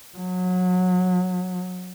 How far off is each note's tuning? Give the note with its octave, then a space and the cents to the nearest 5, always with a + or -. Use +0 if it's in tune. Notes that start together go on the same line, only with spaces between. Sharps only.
F#3 -25